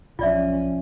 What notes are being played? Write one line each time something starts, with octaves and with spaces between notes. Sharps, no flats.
B1 F3 C#4 F4 D5 E5